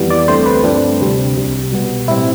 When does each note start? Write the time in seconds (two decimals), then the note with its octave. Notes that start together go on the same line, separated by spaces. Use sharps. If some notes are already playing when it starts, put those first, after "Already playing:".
Already playing: F2 E3 G3 B3
0.10 D5
0.28 D2 D3 A3 C4 C5
0.46 B4
0.64 G2 F3 A3 C4 D4
1.00 D2 C3 G3 C4
1.36 C2 C3 G3
1.72 B2 G3 B3
2.08 A2 G3 C4 E4